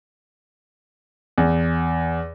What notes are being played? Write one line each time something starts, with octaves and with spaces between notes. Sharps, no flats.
E2